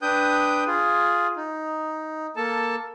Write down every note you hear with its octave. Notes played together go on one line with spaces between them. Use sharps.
D4 B4 G5 D#6 G6
F4 G#4
D#4
A#3 A4 A5